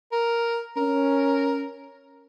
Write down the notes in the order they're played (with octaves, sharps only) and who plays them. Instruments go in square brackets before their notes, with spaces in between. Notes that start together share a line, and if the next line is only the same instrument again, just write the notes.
[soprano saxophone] A#4
[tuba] C#4 [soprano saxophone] A#4